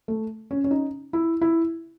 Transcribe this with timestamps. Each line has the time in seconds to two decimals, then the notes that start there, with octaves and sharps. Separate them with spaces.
0.08 A3
0.51 C#4
0.64 C#4
0.71 D#4
1.13 E4
1.41 E4